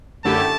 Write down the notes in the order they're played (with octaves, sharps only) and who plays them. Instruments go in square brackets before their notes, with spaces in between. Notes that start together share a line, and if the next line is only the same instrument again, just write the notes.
[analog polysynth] F#2 D3 A3 E4 G4 [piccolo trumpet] A5